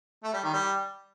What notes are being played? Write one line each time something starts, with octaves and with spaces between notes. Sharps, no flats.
A3
G3
D#3
G3